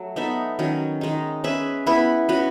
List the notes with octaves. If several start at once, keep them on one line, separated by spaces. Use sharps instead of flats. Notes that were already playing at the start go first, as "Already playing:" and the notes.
Already playing: F#3 A3
B3 D#4 A4 E5
D#3 F#3 C#4
D#3 G#3 D#4
C#4 G#4 B4 E5
B3 E4 B4
C#4 F#4 B4